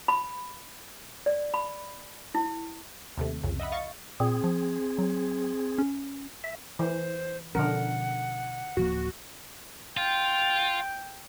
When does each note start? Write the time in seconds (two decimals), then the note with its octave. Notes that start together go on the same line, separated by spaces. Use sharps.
0.08 B5
1.26 D5
1.54 B5
2.35 E4
3.17 D#2 C3 A3
3.43 C2 F2 C#3
3.60 D#5 E5 F#5 B5
3.72 D#5 F5 C#6 A6
4.20 A#2 C4 G#4
4.44 F3
4.98 F#3
5.78 C#4
6.44 E5
6.79 E3 C5
7.55 B2 D3 F3 C#4 A#4 F#5
8.77 D1 F3 A#3 F#4
9.97 F4 G5